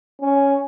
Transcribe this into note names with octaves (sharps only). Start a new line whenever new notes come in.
C#4